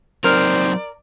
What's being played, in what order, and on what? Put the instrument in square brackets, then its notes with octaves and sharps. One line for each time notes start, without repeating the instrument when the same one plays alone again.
[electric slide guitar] F#3 C4 D#4 [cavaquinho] A#4 [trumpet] C5 [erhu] D5